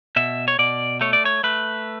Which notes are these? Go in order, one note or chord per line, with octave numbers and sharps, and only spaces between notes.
B2 E5
C#5
B2 D5
A3 C#5
D5
C#5
A3 B4